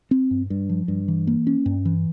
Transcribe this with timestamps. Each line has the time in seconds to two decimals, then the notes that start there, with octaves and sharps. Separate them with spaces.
0.11 C4
0.31 G2
0.50 G2
0.69 F3
0.88 G2
1.08 E3
1.27 A#3
1.47 C#4
1.66 G2
1.85 E3